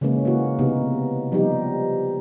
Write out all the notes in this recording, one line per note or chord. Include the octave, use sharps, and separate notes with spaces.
C#3 E3 G#3 A#3 C#4
A#3 E4 F#4
C3 B3 D#4
F3 G3 B3 D#4 G4